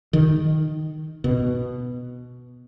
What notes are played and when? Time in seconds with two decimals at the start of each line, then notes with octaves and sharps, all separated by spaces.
0.13 D#3
1.24 B2